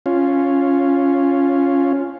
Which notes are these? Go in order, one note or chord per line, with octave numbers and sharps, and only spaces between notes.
C#4 F4